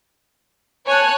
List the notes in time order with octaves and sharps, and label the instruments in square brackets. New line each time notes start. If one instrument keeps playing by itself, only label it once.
[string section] C#5 F#6 [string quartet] G#5 A5